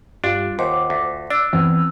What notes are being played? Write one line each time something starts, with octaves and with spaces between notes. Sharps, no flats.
G2 G3 D4 F4
D#2 C5 F#5 D6
D2
D4 D5 E6
E2 C4